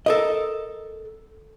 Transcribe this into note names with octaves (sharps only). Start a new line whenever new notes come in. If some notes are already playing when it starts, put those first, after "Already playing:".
A4 A#4 D#5